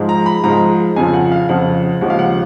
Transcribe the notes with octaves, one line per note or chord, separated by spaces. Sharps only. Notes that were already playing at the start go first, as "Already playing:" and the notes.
Already playing: G#2 F3 G#3
A#5
B5
G#2 F3 G#3 A#5
F2 C#3 F3 G#5
F#5
F5
F2 C#3 F3 F#5
D#2 C#3 F3 G#3 F#5
F5
F#5